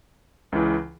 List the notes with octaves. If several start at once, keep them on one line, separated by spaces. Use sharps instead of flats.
C#2 C#3 E3